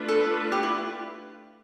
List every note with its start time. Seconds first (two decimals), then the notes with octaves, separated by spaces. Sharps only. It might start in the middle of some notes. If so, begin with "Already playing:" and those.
Already playing: A3 D4 F4 B4
0.08 A4
0.52 G4
0.63 E4